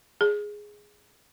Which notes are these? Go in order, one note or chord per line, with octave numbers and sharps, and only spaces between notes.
G#4